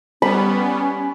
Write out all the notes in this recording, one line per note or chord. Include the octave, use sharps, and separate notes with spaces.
G3 B3 C#4 B5